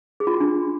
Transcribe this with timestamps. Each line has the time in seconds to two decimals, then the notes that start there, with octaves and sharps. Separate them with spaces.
0.20 G#4
0.27 F4
0.34 F#4
0.40 D4